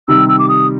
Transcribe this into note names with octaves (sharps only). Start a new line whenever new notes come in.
C3 D#3 G3 E6
E6
D6
D#6